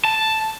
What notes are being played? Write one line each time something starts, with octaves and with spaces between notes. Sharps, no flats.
A5